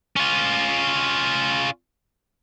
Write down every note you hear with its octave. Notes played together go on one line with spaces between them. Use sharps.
C#4 F4